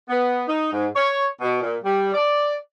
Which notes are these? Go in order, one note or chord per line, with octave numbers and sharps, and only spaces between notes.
B3
D#4
G#2
C#5
B2
A#2
G3
D5